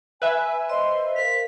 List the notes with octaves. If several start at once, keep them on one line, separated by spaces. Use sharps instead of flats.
B4 E5 G#5
C5 D#5 C6
A#4 F5 B6